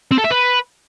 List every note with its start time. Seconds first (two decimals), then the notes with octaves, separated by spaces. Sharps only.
0.12 C4
0.18 A4
0.24 E5
0.31 B4